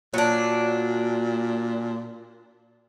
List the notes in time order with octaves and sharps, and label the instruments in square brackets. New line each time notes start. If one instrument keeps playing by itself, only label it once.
[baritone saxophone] A#2 [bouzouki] F#3 D4